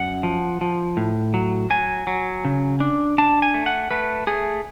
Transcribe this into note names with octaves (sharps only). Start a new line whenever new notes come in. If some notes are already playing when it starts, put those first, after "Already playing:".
Already playing: F#2 F#5
F3
F3
A2
F#3
F#3 G#5
F#3
C#3
D4
D4 A5
G#5
A3
F#5
A3 B4
A3 G#4